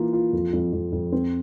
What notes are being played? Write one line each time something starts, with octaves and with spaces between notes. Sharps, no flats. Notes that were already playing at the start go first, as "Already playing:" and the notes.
Already playing: E3 A#3 F4
F4
F2
F2
F2
F2
C4